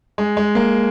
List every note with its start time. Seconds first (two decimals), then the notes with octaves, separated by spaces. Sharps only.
0.18 G#3
0.37 G#3
0.55 A#3